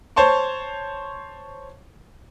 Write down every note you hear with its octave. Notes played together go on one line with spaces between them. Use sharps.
C5 C#5 A5 C6 C#6